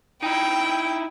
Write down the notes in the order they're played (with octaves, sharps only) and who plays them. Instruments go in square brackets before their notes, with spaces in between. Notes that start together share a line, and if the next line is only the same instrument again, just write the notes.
[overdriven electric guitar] D#4 E4 [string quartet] G5